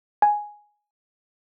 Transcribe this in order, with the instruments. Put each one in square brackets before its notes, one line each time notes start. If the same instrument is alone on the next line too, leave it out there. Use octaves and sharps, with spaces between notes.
[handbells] G#5